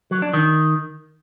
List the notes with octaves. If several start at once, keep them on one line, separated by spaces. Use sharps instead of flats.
F#3
D4
D#3